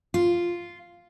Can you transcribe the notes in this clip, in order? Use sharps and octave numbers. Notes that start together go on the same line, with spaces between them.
F4